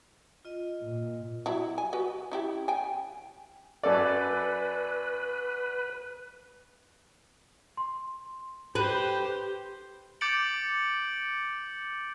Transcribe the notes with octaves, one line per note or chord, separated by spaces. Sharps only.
F4 D#5
A#2
F#3 E4
G#5
F#4 B4
C#4 E4 G4
G5 G#5
F#2 A4 B4 D5
C6
G4 B4 C5
D6 G6 A6 C#7 D7 F#7